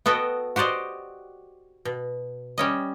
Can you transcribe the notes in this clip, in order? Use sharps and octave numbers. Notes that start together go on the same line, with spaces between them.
B3 F#4 A4 D#5 G5
F#4 G4 C5 D5 D#5
B2
G3 C#4 D#5